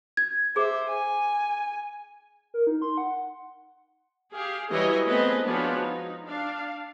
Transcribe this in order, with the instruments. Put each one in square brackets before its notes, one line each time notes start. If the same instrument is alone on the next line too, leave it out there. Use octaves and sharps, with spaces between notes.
[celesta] G#6
[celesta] G#4 D6 [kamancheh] C5 E5
[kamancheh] G#5
[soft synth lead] A#4
D#4
C6
F#5
[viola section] G4 G#4 F5
E3 F#3 G3 C#5 D#5 G#5
A3 B3 C4 G#4 B4 D#5
F3 G#3 B3 D4 F#4 C#5
D#4
D4 F5